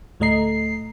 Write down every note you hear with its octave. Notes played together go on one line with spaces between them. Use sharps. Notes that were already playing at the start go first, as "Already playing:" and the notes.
D2 A2 A3 D#5 A#5 C7